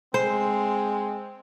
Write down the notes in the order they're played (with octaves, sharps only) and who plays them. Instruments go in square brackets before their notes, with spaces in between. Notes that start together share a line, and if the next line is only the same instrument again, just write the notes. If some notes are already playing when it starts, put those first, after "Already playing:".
[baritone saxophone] G#3 [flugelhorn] C4 [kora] C5